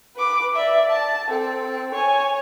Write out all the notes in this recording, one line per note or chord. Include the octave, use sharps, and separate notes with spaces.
B4 D6
D5 E5
A5
C4 A4
C#5 G#5